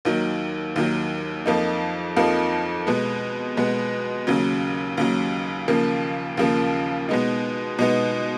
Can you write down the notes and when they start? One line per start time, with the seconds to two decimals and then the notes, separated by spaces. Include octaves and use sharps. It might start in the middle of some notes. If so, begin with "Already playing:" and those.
0.05 D#2 D#3 F#3
0.76 D#2 D#3 F#3
1.46 F2 F3 A#3 D#4
2.17 F2 F3 A#3 D#4
2.87 B2 G#3 B3
3.57 B2 G#3 B3
4.27 D#2 C#3 F#3
4.97 D#2 C#3 F#3
5.68 D#2 C#3 F3 A#3
6.37 D#2 C#3 F3 A#3
7.09 B2 G#3 B3 D#4
7.79 B2 G#3 B3 D#4